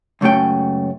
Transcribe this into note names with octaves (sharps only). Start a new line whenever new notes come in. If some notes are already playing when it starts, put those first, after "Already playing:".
C#2 F#2 A3 C#4 G5